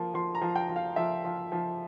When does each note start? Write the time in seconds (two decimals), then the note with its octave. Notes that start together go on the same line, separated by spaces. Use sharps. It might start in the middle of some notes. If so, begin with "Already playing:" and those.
Already playing: F3 A#3
0.14 F3 C6
0.35 A#5
0.41 F3
0.56 G5
0.69 F3
0.76 F5
0.96 F3 E5
1.24 F3
1.52 F3